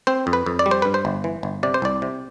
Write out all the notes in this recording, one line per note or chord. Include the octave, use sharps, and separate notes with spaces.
C4 C5
F2
B4
F2
D5
G3
C5
G2 B4
C5
G1
E3
G1
C3 D5
C5
C2 D5
C3